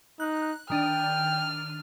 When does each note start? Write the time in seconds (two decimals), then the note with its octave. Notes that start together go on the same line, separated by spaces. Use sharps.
0.20 D#4 F#6
0.70 D#3 D4 G5 F6 D#7